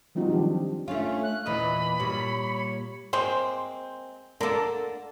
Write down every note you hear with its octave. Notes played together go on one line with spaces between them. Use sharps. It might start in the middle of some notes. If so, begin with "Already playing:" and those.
F3 G3 C4 D#4 F4 F#4
D#3 F3 F#3 D4 G4
A3 C#4 D4 F4
F#6
E2 A#2 E3 D#5 B5
A#2 G3 C#5
G#3 A#3 C4 C5
D3 A#3 A4 A#4